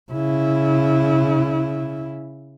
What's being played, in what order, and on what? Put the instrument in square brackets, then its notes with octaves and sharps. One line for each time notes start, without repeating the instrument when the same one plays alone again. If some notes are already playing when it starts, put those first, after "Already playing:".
[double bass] C#3 E4